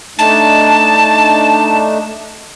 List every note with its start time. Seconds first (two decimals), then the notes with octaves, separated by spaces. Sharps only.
0.19 A3 D4 D#4 A5